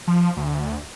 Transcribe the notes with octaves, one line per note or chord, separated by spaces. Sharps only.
F3
D2